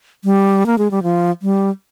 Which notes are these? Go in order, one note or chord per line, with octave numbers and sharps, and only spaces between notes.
G3
A#3
G#3
G3
F3
G3